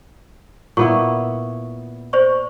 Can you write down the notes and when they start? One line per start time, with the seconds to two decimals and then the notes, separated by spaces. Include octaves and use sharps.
0.77 A#2 B3 E4 C#6
2.13 C5 D5 C#6